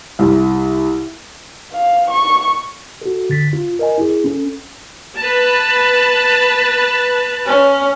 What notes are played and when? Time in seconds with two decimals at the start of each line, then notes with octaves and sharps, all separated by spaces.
0.19 C2
1.73 F5
2.11 C#6
3.01 F#4 A4
3.30 D3 A6 B6
3.53 F4
3.79 A#4 D#5 G#5
3.98 E4 G#4
4.24 C#4 A4
5.18 B4 A5
7.46 C#4